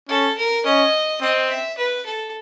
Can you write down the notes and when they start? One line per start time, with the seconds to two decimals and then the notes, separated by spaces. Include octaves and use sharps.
0.09 C#4 A4
0.38 A#4
0.65 C#4 D#5
1.21 C4 D#5
1.49 E5
1.78 B4
2.06 A4